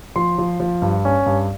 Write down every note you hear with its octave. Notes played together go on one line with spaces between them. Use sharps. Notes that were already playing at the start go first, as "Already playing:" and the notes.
F3 C6
F3
F3
G2
C#4
G2